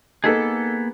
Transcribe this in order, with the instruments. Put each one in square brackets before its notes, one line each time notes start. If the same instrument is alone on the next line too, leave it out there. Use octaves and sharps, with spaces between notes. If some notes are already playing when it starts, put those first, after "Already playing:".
[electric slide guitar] A#3 B3 G#4 [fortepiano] D#4 A4 B4